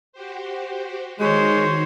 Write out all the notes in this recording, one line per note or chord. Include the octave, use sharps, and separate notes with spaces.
F#4 G4 C5
D#3 G#3 D#4 F#4 C5 C#5